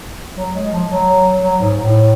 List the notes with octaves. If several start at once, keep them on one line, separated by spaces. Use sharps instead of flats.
F#3
G#3
F3
F#3
F#3
G#2
A2